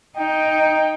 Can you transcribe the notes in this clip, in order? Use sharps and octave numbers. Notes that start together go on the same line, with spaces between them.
D#4 G5